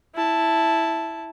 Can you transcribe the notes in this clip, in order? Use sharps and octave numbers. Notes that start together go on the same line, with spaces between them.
E4 A5